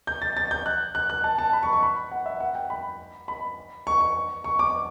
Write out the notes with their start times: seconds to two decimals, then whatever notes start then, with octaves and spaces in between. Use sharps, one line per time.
0.07 G6
0.22 A6
0.37 A6
0.51 G6
0.66 F#6
0.95 F#6
1.10 F#6
1.24 A5
1.38 A5
1.53 B5
1.63 C#6
1.73 C#6
1.82 B5
2.12 F#5
2.26 E5
2.40 F#5
2.55 G5
2.70 B5
3.28 B5
3.87 C#6
4.01 C#6
4.44 C#6
4.59 D6